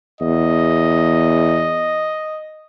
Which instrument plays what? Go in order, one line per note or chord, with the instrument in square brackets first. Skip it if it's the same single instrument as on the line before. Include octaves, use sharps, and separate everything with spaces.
[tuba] E2 [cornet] D#5